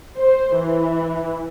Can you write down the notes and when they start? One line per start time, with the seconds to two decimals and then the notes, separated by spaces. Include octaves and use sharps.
0.18 C5
0.55 E3